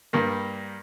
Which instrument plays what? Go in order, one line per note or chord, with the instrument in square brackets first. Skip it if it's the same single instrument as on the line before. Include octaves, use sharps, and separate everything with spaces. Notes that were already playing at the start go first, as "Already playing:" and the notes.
[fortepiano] G2 G3 A#3